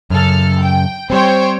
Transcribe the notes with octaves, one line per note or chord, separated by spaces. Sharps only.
F#2 C#3 A4 F6
G5
G3 C4 C5 C#5 G5